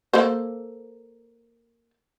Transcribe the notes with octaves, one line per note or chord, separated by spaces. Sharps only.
A#3 A4 C5